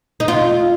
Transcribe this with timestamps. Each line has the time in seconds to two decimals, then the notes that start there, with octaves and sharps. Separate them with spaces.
0.20 D#4
0.28 F4